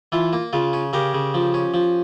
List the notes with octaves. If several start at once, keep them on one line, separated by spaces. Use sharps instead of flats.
E3 F4
A#3
C#3 F4
C#4
C#3 G4 A#4
C#3
F3
C#4
F3